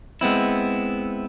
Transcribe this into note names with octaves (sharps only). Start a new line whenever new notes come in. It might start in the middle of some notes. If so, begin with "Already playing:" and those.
G#3 B3 C4 E4